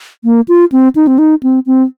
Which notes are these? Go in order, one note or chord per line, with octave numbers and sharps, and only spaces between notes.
A#3
F4
C4
D#4
C4
D#4
C4
C4